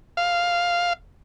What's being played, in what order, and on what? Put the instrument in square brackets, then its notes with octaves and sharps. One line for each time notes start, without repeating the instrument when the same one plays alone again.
[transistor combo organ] F5